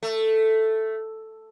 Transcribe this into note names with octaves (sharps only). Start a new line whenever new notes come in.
A3